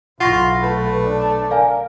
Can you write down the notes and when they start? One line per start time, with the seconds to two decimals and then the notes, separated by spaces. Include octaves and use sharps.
0.20 B1 E4 F4 F#5 C#6 A#6
0.62 A3 B4
1.04 D4 A5
1.51 A#4 D5 F5 G#5